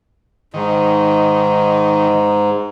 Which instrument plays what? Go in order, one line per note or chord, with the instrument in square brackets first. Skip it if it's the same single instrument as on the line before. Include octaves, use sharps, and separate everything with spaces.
[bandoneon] G#2 [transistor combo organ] D#3